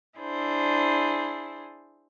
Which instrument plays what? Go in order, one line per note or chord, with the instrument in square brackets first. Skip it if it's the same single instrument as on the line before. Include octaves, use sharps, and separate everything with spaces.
[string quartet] D4 E4 G#4 C5